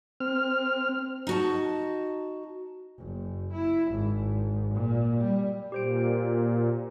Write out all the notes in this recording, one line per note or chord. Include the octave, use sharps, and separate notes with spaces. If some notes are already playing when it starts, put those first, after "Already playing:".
C4 F6
D#4 F#4 A5
F#1
E4
G#1
A#2
G3
A#2 G4 C5 D7